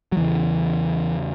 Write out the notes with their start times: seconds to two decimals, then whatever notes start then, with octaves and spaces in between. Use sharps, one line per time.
0.12 F#3
0.17 E2 C#3 E3